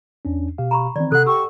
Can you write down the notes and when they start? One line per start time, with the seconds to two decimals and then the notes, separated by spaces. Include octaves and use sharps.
0.25 E2 C#4 D4
0.58 B2 G4 F5
0.71 A#5 B5 C#6
0.96 D#3 E3 C4 D5
1.12 C3 A4 F#5 F#6
1.26 G4 G5 C#6 E6